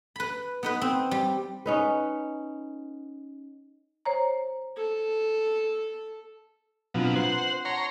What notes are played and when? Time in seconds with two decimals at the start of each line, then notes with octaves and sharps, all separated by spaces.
0.16 B4 B5
0.63 B3 D#4 B4
0.81 C4
1.11 G3
1.66 C#4 D#4 B4
4.05 C5 C#5 A#5
4.76 A4
6.94 B2 F3 F#3 C4 D4 F4
7.16 B4 C5 F#5 A#5
7.65 C#5 F#5 A5 A#5 C6